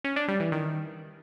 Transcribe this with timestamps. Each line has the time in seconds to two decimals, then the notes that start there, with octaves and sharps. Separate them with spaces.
0.04 C#4
0.16 D4
0.28 G3
0.40 E3
0.52 D#3